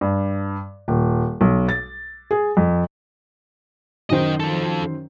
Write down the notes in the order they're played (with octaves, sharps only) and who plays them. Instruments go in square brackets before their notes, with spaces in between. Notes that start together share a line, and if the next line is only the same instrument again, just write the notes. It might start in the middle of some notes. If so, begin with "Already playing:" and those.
[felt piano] G2
D#1
B1
A6
G#4
F2
[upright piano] F#2 D#3 C5 [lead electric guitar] D#5 G5
[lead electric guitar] F3 A4